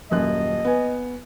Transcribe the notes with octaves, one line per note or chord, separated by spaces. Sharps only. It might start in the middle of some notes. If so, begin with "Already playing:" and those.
D#1 F#2 D#5 F#6
B3 G#5